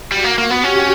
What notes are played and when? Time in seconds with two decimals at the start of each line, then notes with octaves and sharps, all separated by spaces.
0.12 G3 F#4
0.24 A#3
0.38 A#3
0.50 B3
0.63 C#4 G4